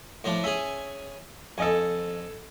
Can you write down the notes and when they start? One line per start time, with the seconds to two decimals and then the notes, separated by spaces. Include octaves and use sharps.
0.24 A2 F3 D4
0.44 C#4 G#4 E5
1.58 F2 A4 D#5 G#5